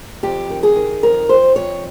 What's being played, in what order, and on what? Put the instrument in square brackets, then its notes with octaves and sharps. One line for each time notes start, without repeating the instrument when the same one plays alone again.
[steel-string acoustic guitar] F2 G4
D#3
G#4
D#3
F2 A#4
F2 C5
F2 C#5